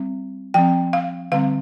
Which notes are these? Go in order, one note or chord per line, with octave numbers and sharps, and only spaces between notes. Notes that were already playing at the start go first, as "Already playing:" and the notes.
Already playing: G3 C4
F3 C4 G5
F5
D3 G3 C4 F5